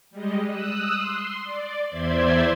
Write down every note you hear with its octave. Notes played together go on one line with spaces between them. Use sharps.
G3 G#3 D#5
D#6 E6 F#6
C6
D5
E2 C5 D5 E5 C6 G#6